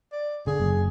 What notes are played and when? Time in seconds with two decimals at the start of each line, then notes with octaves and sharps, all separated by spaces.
0.12 D5
0.47 D3 G#4
0.60 F#1